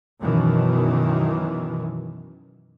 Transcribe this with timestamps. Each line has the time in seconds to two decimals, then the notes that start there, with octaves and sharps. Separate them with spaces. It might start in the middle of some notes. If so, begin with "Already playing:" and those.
0.21 F#2 B2 D#3 E3